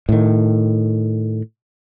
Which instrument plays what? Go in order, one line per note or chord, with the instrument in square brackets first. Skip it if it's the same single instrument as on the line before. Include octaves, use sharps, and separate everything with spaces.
[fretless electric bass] A2 D#3